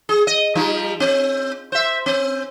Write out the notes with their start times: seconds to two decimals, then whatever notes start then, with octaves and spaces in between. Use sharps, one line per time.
0.09 G#4
0.27 D#5
0.55 F3 G3 D#4
1.00 C4
1.72 C5 E5
2.06 C4